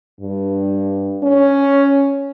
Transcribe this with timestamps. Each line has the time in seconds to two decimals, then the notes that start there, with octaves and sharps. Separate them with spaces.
0.21 G2
1.23 C#4